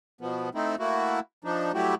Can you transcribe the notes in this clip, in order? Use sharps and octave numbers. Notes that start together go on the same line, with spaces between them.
B2 F3 B3
A3 C4 D#4 E4
A3 A#3 E4 F#4
F3 D4 D#4
F#3 G3 A3 E4 F#4 G4